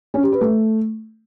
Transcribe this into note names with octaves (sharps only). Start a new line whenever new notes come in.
C#4
G4
B4
A3